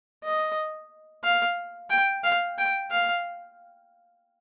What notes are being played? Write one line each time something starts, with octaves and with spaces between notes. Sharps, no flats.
D#5
F5
G5
F5
G5
F5